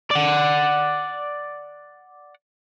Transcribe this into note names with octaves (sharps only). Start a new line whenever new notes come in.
D5 F#5